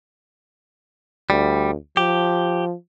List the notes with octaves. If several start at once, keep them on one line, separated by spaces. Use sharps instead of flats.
D2 G3
F3 G4